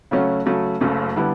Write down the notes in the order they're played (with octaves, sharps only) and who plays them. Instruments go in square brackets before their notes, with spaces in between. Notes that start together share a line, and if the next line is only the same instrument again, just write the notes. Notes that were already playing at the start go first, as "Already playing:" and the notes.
[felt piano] C#3 F#3 A3 C#4 F#4
C#3 F#3 A3
F#1 F#2 C#3 F#3 A3
D3 G3 B3 E4